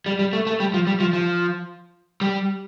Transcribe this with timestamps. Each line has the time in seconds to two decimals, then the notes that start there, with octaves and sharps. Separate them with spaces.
0.06 G3
0.19 G3
0.33 A3
0.47 A3
0.60 G3
0.74 F3
0.87 G3
1.00 F3
1.13 F3
2.21 G3